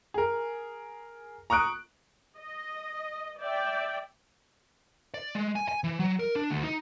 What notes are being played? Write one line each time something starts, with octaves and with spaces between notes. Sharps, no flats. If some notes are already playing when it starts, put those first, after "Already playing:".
G#4 A#4
A#5 C#6 D#6 F#6 D7
D#5
D5 E5 G5
D5
G#3
G#5
G#5
E3
F#3
A#4
D4
D2
D#4